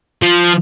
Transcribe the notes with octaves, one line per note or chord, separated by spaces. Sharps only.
F3